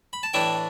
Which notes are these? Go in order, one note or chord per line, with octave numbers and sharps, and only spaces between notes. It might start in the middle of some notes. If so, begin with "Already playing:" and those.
B5
A5
A2 E3 A3 D4 G5